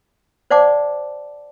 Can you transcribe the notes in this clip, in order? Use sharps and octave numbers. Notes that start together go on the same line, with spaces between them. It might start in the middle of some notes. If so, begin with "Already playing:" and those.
C5 D5 F#5 A5 D6